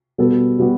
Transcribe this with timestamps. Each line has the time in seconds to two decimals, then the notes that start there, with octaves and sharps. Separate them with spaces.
0.18 B2 G3 B3 F#4 A4
0.58 B2 G3 B3 F#4